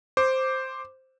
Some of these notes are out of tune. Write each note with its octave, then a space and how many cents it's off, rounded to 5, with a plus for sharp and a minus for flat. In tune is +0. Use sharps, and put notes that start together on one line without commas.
C5 +0 D6 +0